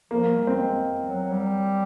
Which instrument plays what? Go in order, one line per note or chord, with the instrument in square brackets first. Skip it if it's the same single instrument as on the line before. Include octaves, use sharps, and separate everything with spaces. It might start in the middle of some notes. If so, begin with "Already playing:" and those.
[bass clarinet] F3 [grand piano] A#3
[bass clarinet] G3
[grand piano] C4
[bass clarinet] G#3
F#3
G3